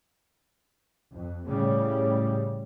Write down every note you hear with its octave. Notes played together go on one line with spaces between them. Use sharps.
F2
A2 C#3 G3